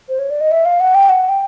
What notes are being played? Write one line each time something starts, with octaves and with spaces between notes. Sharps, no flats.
C5
C#5
D5
D#5
E5
F5
F#5
G5
F#5
G5